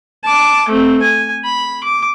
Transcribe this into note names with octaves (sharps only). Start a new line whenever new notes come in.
A5 D6
A3 C4
G#5
B5
D6